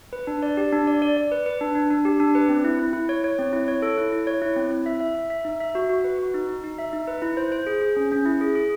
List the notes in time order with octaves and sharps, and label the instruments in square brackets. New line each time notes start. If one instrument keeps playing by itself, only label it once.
[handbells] B4
D4
D5
G4
D4
D5
D5
D5
B4
B4
D4
D4
D4
G4
D4
B4
C4
E4
E4
E4
C#5
C#5
C4
E4
C#5
A4
E4
E4
C#5
E4
C4
E4
E5
E5
E5
E5
D#4
E5
F#4
F#4
B4
F#4
D#4
D#4
D#4
E5
D#4
B4
E4
C5
C5
G#4
G#4
C#4
C#4
E4
G#4
G#4